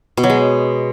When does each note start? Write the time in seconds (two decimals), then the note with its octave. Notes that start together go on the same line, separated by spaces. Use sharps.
0.17 B2
0.24 F#3
0.30 G#3